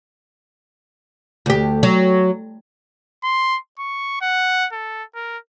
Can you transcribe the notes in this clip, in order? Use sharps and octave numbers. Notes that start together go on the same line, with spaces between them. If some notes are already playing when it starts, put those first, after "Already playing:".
D2 G4
F#3
C6
C#6
F#5
A4
A#4